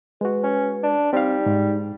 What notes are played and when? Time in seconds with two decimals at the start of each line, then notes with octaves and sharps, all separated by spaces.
0.21 G#3 F#4 B4
0.43 C#4
0.83 D4
1.13 G3 C4 D#4 F5
1.46 G#2